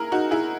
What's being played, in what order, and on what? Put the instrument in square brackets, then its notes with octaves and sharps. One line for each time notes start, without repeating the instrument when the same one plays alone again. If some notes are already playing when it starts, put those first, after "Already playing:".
Already playing: [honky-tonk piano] E4 G#4 A#4
D#4 F#4
E4 G#4